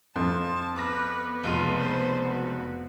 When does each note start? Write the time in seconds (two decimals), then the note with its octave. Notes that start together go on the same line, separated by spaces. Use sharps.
0.16 F2 A5 C6
0.76 B3 B4 D6 F6 A#6
1.43 F1 C#2 F4 D#7
1.78 C5
2.23 F#4